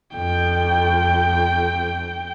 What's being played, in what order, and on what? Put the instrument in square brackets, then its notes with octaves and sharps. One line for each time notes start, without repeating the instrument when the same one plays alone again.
[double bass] F2 [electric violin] G5